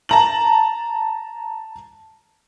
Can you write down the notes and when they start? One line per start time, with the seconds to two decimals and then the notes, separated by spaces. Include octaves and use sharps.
0.09 A5 A#5 F#7